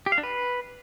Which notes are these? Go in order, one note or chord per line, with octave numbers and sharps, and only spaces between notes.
G4
F5
D4
B4